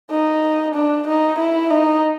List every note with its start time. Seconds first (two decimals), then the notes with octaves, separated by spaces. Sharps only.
0.11 D#4
0.75 D4
1.07 D#4
1.39 E4
1.71 D#4